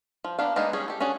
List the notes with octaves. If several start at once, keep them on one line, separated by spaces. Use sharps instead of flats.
F3
A#3 B3 D4 F5
G#3 A#3 B3 D4 D#4
G3 C#4 G#4
G4 A4
C#4 D4 F#4 G#4